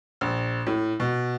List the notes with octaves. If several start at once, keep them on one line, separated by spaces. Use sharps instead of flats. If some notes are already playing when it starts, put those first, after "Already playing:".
A#1
A2
B2